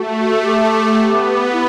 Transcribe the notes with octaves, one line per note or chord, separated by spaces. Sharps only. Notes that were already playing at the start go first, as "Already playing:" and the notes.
Already playing: A3 F#4
A4
G4
B3
E4